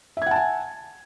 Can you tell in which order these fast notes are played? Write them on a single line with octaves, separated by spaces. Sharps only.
E5 G#6 F#5 A5 G#5